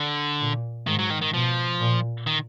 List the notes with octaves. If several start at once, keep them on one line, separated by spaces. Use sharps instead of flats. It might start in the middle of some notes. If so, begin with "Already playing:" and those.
Already playing: D3
A#2
G#2 D#3
F#3
D#3
D#3
B2 F3
A#2
D#3